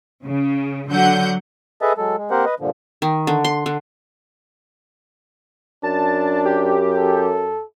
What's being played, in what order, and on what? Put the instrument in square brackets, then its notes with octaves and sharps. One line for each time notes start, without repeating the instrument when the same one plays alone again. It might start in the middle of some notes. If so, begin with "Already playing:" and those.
[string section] C#3
D3 F#3 F#5 G6
[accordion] G#4 A4 B4 D#5 E5 A5
F#3 G#3 A4
G#3
A#3 C4 G4 A#4 C5 F#5
B4 D#5
G2 A#2 D3 F3
[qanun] D#3
D3
C6
D3
[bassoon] F#2 [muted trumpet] D4 [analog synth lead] A5
[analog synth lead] G4
[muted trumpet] A4